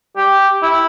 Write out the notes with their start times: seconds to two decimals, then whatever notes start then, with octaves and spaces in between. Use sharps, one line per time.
0.17 G4
0.63 E4